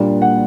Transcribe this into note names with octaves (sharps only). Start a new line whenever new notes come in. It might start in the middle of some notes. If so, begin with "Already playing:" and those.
Already playing: A#2 G3 A#3 D4
F#5